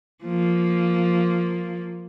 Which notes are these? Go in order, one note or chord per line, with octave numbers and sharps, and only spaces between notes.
F3 A#3